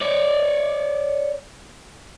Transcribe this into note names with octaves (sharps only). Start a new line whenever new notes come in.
C#5 D5